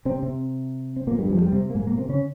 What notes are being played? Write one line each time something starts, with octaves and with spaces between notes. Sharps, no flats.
C3 C4
C3 C4
C4
A#2 A#3
G2 G3
F2 F3
G#3
G2 G3
C3 C4
A#3
G#2 G#3
A#2 A#3
C3 C4
C#3 C#4